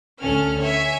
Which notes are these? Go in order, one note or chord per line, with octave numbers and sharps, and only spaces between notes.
D2 C#4 A4 F6
C#5 E5 G#5